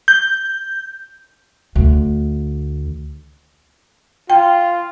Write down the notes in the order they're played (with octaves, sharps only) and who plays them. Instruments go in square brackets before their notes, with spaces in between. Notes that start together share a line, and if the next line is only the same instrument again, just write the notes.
[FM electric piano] G6
[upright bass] D2
[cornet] F4 [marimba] G5